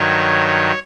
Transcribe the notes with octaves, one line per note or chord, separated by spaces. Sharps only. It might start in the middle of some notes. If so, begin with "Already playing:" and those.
Already playing: G2 D#3 F#3 C#5